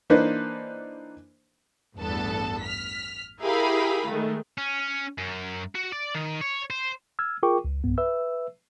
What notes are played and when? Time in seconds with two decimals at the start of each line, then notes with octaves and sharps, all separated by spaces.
0.10 E3 A#3 D4 D#4 B4 C5
1.98 A1 E2 G2 B3 A4 A5
2.62 F6 B6
3.42 E4 G4 G#4 A#4 F5 B5
4.07 D#3 G#3 A3
4.58 C#4
5.18 F#2
5.75 F#4
5.92 D5
6.14 D#3
6.41 C#5
6.70 C5
7.19 E6 F6 G#6
7.43 F4 G#4 A#4 G5 C#6 D6
7.65 C#2
7.84 B1 G2 B3
7.98 B4 E5 E6